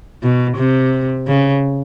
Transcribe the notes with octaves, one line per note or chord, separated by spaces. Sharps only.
B2
C3
C#3